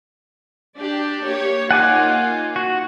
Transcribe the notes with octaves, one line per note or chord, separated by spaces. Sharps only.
D4 G4 D5
A#3 G4 C#5
A#3 D#4 F4 F#5 G#5 D6
F#4